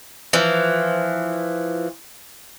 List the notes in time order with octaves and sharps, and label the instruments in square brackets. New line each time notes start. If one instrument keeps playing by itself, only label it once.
[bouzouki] E3 F3